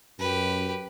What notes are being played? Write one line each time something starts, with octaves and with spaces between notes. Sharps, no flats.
F#2 G4 B4